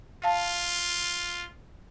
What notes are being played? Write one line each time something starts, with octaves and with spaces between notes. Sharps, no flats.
F4 F5 A5